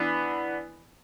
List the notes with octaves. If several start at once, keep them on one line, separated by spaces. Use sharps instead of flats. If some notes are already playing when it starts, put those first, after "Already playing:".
Already playing: E3 B3 D4